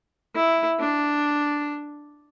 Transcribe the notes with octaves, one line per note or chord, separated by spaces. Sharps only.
E4
D4